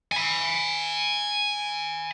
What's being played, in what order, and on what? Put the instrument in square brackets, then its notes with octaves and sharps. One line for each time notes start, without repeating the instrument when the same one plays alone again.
[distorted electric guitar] G#5 B5